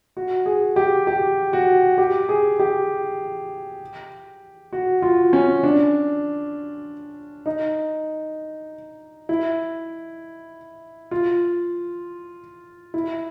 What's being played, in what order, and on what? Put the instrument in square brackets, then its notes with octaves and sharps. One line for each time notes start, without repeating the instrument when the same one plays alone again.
[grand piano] F#4
G#4
G4
G4
F#4
G4
G#4
G4
F#4
F4
C#4
D4
D#4
E4
F4
E4